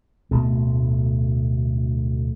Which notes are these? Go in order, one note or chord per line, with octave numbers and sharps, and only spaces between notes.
D1 D2 B2 A3